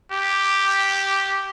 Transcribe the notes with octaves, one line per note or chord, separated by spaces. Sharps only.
G4